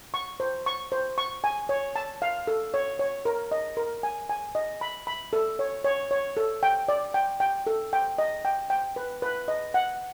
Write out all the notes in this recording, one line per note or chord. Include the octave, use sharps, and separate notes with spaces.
C#6
C5
C#6
C5
C#6
G#5
C#5
A5
F5
A4
C#5
C#5
A#4
D#5
A#4
G#5
G#5
D#5
B5
B5
A4
C#5
C#5
C#5
A4
G5
D5
G5
G5
A4
G5
D#5
G5
G5
B4
B4
D#5
F#5